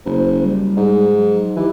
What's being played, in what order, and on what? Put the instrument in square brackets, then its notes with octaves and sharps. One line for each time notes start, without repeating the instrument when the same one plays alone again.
[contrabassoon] F#1 [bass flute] C5
[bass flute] G3
[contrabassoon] G#2
[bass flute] F#3
F#3
[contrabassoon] E3 [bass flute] G4